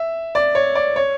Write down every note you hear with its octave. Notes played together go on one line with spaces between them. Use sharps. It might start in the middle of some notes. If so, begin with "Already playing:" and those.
Already playing: E5
D5
C#5
D5
C#5